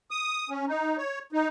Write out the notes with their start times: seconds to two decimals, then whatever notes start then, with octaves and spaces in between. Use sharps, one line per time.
0.11 D#6
0.50 C#4
0.68 D#4
0.97 C#5
1.32 D#4